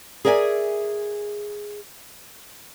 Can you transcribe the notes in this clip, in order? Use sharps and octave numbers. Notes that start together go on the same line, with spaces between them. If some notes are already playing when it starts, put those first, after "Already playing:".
G#4 A#4 D5 E5 G5 G#5